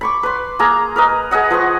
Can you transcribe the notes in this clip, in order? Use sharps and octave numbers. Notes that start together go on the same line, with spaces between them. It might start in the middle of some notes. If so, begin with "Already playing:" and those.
B5 C#6 D6
B4 C6
A#3 G#4 A#5
A#4 B4 D#5
G#4 B4 D#5 F#5
F3 B4 F#5 C#6